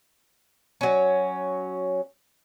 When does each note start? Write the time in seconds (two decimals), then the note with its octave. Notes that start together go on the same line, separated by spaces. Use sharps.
0.81 F#3 C#4